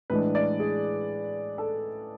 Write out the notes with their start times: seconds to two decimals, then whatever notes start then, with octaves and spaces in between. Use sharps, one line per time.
0.10 A2 E3 G#3 D4 B4
0.35 D5
0.60 G#4
1.58 A4